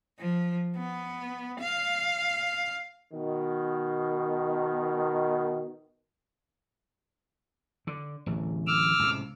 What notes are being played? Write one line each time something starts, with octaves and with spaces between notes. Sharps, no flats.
F3
B3
F5
B2 D#3
D3
D1 A1
D6 E6 F6
C#2 A2 C3